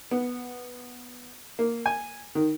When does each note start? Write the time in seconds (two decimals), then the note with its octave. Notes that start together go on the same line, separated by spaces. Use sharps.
0.11 B3
1.59 A#3
1.86 G#5
2.35 D#3